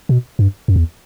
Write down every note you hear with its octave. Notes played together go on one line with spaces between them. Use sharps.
B2
G2
F#2
E2